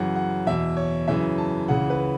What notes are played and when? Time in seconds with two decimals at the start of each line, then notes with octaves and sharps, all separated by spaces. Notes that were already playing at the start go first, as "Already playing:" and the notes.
Already playing: F#2 C#3 E3 F#5
0.16 F#5
0.47 E2 B2 E5
0.77 C#5
1.08 F#2 C#3 E3 E5
1.38 A5
1.68 C#2 C#3 E3 F#5
1.90 B4